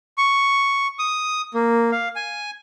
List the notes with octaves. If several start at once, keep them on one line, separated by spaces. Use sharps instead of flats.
C#6
D#6
A#3
F5
G#5